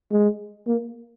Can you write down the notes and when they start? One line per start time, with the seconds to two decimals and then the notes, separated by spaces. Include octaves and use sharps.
0.11 G#3
0.67 A#3